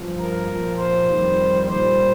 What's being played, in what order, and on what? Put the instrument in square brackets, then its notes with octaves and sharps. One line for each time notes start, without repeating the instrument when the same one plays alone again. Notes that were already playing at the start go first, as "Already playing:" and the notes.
Already playing: [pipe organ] G2 F3
A#4
A#2 F3
C5
F2 D#3 G3
A#2 G3 C5